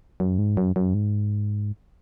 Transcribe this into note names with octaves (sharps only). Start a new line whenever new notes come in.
F#2
G#2
F#2
F#2
G#2